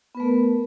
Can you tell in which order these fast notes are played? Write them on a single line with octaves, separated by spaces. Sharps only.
B3 B4 A3 A#4